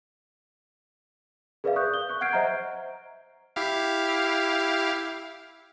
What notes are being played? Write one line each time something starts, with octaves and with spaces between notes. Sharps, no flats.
G#4 A#4 B4 D5 E5 F5
C#6 D#6 F#6 G6
G7
C#6 F#6
F#5 F6 G6 G#6 C7 D7
C5 D#5 E5 F#5 A#5
E4 G4 F5